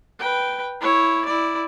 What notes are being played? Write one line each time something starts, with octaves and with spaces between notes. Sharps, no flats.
B4 G5
E4 C#5
E4 D5